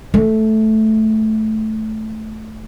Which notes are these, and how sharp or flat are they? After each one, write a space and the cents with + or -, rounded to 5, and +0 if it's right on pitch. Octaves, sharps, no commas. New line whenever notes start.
A3 -10